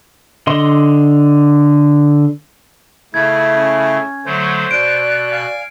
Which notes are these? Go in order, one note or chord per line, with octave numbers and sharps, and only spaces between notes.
D3 D#5 C6
C#3 A3 E4 G#6
C#4
D3 F#3 A3 C5
B2 D5 F#6 D7
F5 G#5